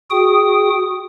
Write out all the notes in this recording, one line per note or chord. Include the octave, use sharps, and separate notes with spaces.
F#4 G#4 G5 D#6